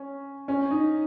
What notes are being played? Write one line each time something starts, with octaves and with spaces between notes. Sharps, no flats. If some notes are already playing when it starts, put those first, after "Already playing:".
Already playing: C#4
C#4
D#4